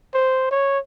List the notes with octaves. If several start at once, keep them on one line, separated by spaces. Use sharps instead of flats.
C5
C#5